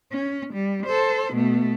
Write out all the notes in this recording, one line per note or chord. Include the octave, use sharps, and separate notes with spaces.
C#4
G3
A4 C5
B2 A3